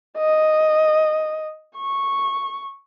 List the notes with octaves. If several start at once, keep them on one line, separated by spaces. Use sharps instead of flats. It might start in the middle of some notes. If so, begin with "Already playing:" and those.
D#5
C#6